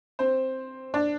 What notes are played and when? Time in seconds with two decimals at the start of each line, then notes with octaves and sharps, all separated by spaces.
0.19 C4 C5
0.94 D4 D5